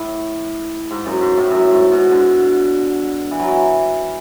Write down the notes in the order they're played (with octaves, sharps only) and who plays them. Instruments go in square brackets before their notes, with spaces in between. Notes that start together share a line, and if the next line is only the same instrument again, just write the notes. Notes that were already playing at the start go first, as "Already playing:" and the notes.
Already playing: [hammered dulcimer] A2
G#2
F#2
G#2
A2
F#2
G#2
B2
D3
E3
F#3
E3